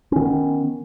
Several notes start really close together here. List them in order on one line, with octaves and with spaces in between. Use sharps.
C#4 D#3 B3